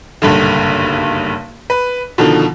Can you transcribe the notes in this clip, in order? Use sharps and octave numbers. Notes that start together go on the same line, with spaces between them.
F#1 B1 G2 D3
B4
B2 D3 D#3 F3